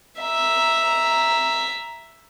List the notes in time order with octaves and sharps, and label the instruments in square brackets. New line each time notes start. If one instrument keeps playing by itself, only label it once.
[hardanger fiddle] E5 A#5